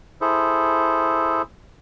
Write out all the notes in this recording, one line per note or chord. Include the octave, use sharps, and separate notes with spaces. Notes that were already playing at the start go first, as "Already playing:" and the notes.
E4 G#4 A4 C5